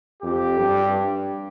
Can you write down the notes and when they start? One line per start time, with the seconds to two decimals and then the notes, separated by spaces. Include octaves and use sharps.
0.23 F2 G4
0.58 G2